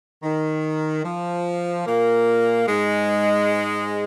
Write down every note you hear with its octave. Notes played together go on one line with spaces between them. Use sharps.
D#3
F3
A#2 A#3
G#2 G#3